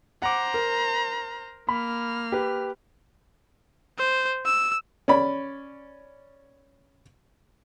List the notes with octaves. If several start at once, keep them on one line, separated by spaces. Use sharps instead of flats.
C5 F#5 A#5 D6
A#4
A#3 B5 F6
G4 B4
C5
E6
C#4 D5 B5